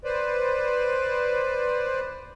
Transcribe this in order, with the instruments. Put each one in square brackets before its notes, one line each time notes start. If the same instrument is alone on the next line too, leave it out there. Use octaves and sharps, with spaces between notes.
[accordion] B4 C5 D5